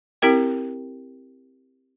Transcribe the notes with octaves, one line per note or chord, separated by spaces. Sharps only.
C4 E4 G4 A#4 G5